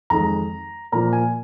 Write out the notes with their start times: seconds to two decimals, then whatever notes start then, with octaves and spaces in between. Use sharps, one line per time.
0.10 F2 D#3 G#3 A#5
0.92 A#2 F3 A#3 A#5
1.13 G#5